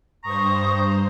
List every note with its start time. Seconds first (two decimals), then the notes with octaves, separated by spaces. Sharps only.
0.24 G2 C5 A#5 C#6 D#6